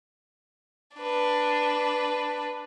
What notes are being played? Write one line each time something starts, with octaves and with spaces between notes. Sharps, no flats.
D4 B4